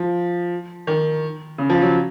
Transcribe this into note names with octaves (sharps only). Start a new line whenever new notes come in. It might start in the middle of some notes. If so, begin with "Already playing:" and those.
Already playing: F3
D#3
C#3
F3
F#3